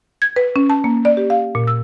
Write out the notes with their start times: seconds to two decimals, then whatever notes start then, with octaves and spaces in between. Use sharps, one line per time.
0.22 G#6
0.36 B4
0.56 C#4
0.70 A5
0.84 A#3
1.05 D5
1.17 G4
1.30 F5
1.55 A#2
1.67 E6